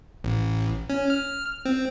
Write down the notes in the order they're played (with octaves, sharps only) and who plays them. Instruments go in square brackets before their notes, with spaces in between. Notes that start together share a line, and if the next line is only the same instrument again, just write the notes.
[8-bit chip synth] A1
C#4
F6
C4